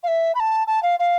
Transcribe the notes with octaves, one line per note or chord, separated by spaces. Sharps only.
F5
E5
B5
A5
A5
F5
F5